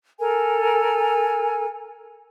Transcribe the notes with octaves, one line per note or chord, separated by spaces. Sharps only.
A4 A#4 G#5